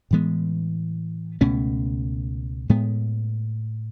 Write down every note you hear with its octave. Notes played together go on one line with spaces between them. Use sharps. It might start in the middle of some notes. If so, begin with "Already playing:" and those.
A2 E3 G#3 B3
C#2 B2 A3 C#4
A2 G#3 B3